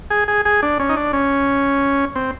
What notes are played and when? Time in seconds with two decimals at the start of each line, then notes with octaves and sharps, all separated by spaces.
0.10 G#4
0.28 G#4
0.45 G#4
0.63 D4
0.79 C#4
0.89 D#4
0.96 D4
1.13 C#4
2.16 C4